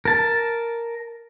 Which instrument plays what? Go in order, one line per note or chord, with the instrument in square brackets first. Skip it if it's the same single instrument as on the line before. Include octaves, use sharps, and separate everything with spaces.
[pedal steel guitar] A#4 A5